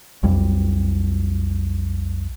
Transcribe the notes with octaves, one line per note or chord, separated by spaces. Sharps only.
B1 F2 G3